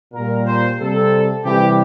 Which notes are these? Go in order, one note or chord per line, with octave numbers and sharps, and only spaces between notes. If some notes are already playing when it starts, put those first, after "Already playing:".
A#2 G3 A#4
C5
C3 G3 A4
C3 E3 G3 G4